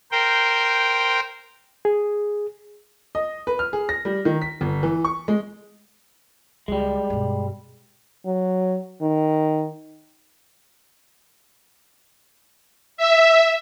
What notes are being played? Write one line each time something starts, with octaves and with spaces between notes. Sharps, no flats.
A#4 C5 G5
G#4
D#5
B4
F6
G#4
A#6
G3
D#3
B6
G1
E3
C#6
G#3
C#2 G3 G#3
G2 B2
F#3
D#3
E5